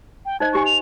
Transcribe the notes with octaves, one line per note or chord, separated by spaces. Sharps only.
G5
D#4 C5 D#5 G#6
D#4 G4 G#5 C#6
F7